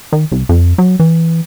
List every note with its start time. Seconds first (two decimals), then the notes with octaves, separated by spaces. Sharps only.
0.12 D#3
0.32 C2
0.49 F2
0.78 F#3
1.00 E3